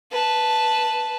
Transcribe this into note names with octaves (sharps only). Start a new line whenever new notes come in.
B4 A5